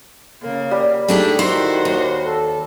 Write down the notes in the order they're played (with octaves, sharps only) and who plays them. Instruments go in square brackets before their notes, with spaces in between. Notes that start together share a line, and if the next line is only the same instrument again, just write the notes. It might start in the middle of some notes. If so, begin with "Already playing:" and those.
[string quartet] C#3 A#3
[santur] G3
[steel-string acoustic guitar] A3 D4 D#4 [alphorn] G4 [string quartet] G#4
[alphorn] D#3 [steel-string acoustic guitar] E4 [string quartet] F#4 C5 [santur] C6
[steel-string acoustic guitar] D#2
[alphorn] A4